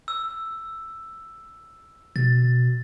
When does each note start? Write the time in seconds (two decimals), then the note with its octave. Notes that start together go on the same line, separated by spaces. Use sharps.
0.08 E6
2.16 B2 A6